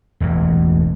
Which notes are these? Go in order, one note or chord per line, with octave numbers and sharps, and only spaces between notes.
E1 A1 E2